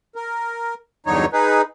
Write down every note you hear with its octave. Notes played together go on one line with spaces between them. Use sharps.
A#4
E2 G2 D3 F#3 D#4 C#5
D#4 G#4 B4